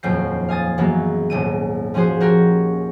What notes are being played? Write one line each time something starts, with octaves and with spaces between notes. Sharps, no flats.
D#1 F2 F3 F#3 G6 C7
F5 G#5 D#6 A6
F#2 E3 F#3 G#3 A#3 B3
D#1 G#1 D#7
F3 C#4 F#4 G#4 C5
F#4 G4 A#4 C#5